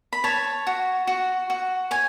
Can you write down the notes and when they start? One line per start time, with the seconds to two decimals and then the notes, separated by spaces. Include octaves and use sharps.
0.13 B5
0.24 C#5 A5
0.67 F#4
1.07 F#4
1.50 F#4
1.91 C#5 G#5